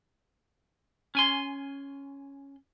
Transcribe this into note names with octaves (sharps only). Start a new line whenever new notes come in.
C#4 G#5 C6